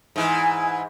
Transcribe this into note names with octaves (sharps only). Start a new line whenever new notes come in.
G#2 E3